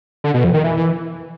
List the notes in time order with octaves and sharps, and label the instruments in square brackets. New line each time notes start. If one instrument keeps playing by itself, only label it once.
[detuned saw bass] D3
B2
F2
D#3
E3